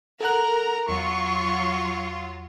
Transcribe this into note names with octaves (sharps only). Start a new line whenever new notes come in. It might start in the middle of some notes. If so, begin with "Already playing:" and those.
A4 A#4 F#5 A#5 F#6
E2 F#3 F4 C#6